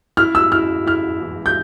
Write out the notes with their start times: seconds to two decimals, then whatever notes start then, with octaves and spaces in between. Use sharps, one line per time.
0.17 E4 F6
0.35 E6
0.52 E4 F6
0.86 E4 F6
1.21 E3
1.46 G6